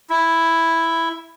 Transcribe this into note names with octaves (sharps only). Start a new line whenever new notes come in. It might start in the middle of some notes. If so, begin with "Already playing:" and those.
E4